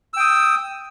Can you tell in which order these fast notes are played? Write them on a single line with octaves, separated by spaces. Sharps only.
E6 G5 D#6